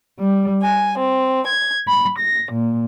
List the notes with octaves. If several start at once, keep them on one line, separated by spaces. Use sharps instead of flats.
G3
G#5
C4
G#6
B5
A#6
A#2